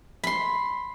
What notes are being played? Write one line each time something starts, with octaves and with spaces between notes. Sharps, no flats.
B5 C6